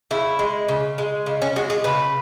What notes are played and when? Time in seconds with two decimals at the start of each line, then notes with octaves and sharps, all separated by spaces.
0.11 C#3 E4
0.39 G#3
0.69 C#3
0.98 G#3
1.26 C#3
1.42 C#4
1.56 G#3 F#4
1.70 G#4
1.84 C#3 B4